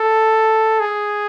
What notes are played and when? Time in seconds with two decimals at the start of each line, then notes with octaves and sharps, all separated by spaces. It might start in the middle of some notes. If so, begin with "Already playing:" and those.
Already playing: A4
0.80 G#4